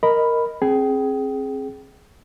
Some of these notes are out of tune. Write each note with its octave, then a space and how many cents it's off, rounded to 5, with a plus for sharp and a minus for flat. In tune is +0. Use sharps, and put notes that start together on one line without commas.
A#4 +0 D#5 +0 B5 +0
C4 +30 G#4 +10 G5 -30